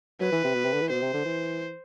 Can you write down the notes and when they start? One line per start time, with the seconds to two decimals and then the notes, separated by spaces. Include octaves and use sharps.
0.20 F#3 B4
0.32 E3
0.44 C3
0.55 B2
0.64 C3
0.73 D3
0.81 E3
0.90 B2 C5
1.02 C3
1.14 D3
1.25 E3